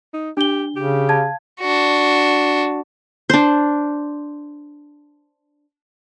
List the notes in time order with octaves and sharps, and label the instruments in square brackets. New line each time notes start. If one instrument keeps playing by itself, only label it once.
[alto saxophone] D#4
[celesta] D4 G7 [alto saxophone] G4
[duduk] C#3 [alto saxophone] G4
[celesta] F5 A5 G#6
[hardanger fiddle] D4 F#4
[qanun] D4 C5